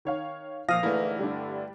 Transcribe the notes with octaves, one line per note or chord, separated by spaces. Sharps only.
D#3 C#5 F5
A#2 F3 F5 D#6 F6 A#6
G#2 D3 E3 A3 A#3 E4
G2 D3 G3 D4